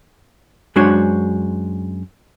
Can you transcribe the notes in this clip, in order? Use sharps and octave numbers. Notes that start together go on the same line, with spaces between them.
F#2 G#3 D4 F#4 C5 C#5